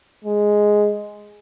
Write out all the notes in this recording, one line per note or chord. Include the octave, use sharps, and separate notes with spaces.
G#3